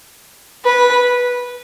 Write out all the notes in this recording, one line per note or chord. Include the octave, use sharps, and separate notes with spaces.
B4